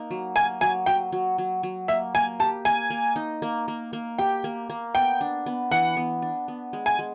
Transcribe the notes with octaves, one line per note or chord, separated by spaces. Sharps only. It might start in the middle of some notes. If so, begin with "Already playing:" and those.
Already playing: A#3 D#4
F#3
A#3 G#5
F#3 G#5
F#3 G5
F#3
F#3
F#3
A#3 E5
A#3 G#5
G4 A5
A#3 G#5
A#3
D#4
A#3
A#3
A#3
G4 G5
A#3
A#3
B3 G5
D4
B3
E3 F#5
B3
D4
B3
G#3
G#5
G#3